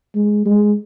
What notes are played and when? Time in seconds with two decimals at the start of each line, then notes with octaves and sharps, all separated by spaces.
0.15 G#3
0.45 G#3